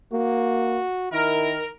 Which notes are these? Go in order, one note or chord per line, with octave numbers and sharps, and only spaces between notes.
A#3 F#4
D#3 E4 A#4